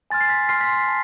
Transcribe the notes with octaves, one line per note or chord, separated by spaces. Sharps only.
G#5 C6 F6 A6
C7
B6
G#5 C6 F6 C7
B6
C7
A5